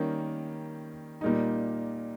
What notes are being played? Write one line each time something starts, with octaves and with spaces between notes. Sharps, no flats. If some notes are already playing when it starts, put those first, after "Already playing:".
Already playing: D#3 G3 A#3 C#4
A#2 G3 A#3 D#4